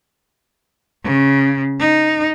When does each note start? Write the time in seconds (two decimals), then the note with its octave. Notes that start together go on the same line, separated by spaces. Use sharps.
1.05 C#3
1.80 D#4